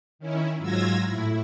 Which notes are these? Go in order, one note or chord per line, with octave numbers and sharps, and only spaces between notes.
D#3 C#4 E4
G#2 F#3 F4 E6 G#6 A#6
A2 E4